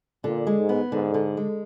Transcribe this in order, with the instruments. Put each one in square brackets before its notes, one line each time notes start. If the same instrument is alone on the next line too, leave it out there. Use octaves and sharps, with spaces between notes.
[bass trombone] A#2 [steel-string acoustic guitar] D3
[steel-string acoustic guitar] G#3
[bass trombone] G#2
[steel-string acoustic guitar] B3
[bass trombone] G#2 [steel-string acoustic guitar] D3
[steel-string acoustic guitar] D3
G#3